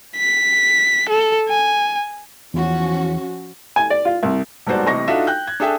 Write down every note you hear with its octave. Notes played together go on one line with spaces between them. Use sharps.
B6
A4
G#5
E2 F3 C#4 F#4
G#5
D5
F4
C2
D#1 G#2 B3 F#4 C5 D5
A1 C3 D#5 C#6 A#6
D4 D#4 F4 F#4 A4 E5
G5 F#6 G6
G#6
D4 G#4 A4 E5 G5 A5